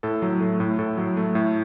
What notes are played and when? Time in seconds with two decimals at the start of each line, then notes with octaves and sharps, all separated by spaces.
0.03 A2 A4
0.22 F#3
0.41 A3
0.60 A2
0.79 A2 A4
0.98 F#3
1.17 A3
1.35 A2